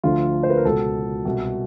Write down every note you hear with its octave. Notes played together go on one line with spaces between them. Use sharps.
D2 D3 F3 F4
C5
B4
A#4
C#2 B2 A4
C2 B2